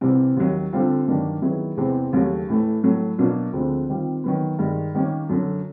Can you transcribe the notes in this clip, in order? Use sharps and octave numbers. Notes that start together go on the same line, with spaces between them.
C2 C3 E3 G3 C4
D#2 D#3 F#3
D3 G3 C4 F4
G2 D#3 F#3 A#3 D4
D#3 F#3 B3 E4 G#4
E2 C3 E3 G#3 C4
D#2 C#3 F#3 A3 C#4
A2 E3 A3
A2 F#3 A3
B2 F#3 A#3 D4
D2 D3 F3 G#3 C4
D#3 G3 C4 F4
D#3 F#3 B3
G2 D#3 G#3
D#3 G3 A#3 C#4
F#2 D3 F#3